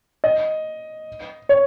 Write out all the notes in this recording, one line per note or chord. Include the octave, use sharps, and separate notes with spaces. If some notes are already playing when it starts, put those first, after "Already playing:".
D#5
C#5